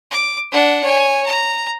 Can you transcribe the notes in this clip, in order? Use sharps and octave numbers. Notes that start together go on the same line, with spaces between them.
D6
D4 F#5
C#5 G#5
A#5